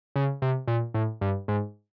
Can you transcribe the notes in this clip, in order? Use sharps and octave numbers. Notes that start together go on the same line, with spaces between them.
C#3
C3
A#2
A2
G2
G#2